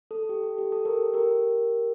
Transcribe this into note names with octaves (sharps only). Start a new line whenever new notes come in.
A4
G4
A4
G4
A4
G4 A#4
G4 A#4